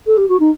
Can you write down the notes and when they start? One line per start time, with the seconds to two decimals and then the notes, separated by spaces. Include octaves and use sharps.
0.06 A4
0.17 G4
0.29 F#4
0.39 D#4